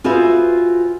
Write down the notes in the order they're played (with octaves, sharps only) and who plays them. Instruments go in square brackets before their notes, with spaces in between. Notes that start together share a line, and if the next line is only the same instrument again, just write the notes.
[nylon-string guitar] F4 F#4 G#4 B4 C5 E5